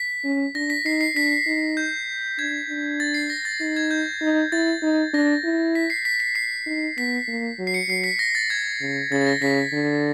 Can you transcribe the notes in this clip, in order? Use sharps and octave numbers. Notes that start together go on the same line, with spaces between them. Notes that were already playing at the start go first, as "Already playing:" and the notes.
Already playing: B6
C#4
D4 A#6
B6
D#4 C7
C7
D4 B6
D#4
G6
D4 G#6
D4
A6
C7
A#6
A6
D#4 A6
G#6
G6
D#4
E4 A6
D#4
D4 A#6
E4
B6
C7
B6
B6
C7
D#4
B3 B6
A#3
F#3
C7
C#7
F#3 C7
B6
A#6
A6
G#6
C#3
C#3 A6
A6
A#6
C#3 B6
D3